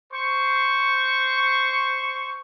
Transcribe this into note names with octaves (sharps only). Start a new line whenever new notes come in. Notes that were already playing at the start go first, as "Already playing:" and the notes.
C5 C#6